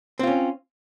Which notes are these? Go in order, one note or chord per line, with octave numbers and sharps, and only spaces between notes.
C4 C#4 F4